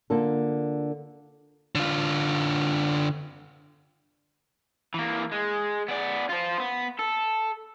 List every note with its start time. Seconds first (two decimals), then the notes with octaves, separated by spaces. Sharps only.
0.10 D3 A#3 F4 A4
1.75 D3 F4
4.94 E3 A#3
5.32 G#3
5.88 B3 D5
6.30 F4 C5
6.60 B3
6.99 A4